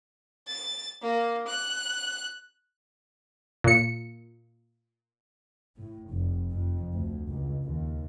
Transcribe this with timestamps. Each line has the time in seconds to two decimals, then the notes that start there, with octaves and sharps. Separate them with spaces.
0.46 A6
1.02 A#3
1.46 F#6
3.64 A#2 C#7
5.79 A2
6.11 F1
6.52 F2
6.93 D2
7.28 C#2
7.65 D#2